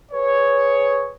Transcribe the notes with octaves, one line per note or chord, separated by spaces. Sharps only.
G#4 B4 C#5